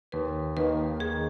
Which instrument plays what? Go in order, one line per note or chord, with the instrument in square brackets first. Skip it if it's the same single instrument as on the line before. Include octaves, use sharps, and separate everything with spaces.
[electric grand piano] D#2 [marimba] B4
[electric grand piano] D#3 A#3 D#4 [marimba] B4
[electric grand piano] D#2 [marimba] G#4